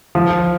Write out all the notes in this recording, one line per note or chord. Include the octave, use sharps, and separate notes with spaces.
F3